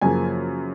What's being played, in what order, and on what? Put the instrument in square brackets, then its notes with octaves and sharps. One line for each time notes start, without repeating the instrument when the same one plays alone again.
[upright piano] F#2 C#3 F3 A#3 G#5